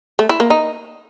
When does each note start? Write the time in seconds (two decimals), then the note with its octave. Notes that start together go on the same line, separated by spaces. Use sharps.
0.19 A3
0.29 E4
0.40 A#3
0.50 D#4